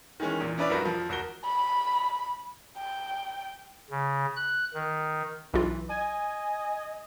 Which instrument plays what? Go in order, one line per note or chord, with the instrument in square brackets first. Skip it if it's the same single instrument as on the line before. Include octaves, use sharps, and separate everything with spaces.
[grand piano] D#3 E3 G#3 C#4
E2 A#2
C#4 D4 E4 B4 D5
C2 G2 F3 F#4 A#4 B4
F2 F3
G#1 F#4 A#4 G7
[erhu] B5
G5
[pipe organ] C#3
F#6
D#3
[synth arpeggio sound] B1 F4 [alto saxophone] E3
[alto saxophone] D#5 [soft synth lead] G#5